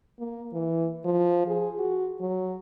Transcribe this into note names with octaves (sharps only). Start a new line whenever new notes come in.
A#3
E3
F3
G#4
F#4
F#3